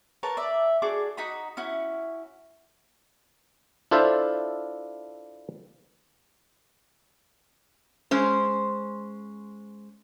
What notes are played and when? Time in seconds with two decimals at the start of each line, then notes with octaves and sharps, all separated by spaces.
0.23 A#4 B4 C#5 A5
0.37 D5 E5
0.82 D4 F#4 G#4 D6
1.17 D#4 F#4 B5 D#6
1.57 C#4 E4 F#4
3.91 D4 E4 F4 A4 C5 E5
8.11 G#3 C#4 C5